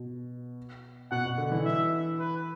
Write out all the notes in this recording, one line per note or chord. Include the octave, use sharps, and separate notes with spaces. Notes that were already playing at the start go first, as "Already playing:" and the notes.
Already playing: B2
B2 F#5
B2
D3
E3
E5
B4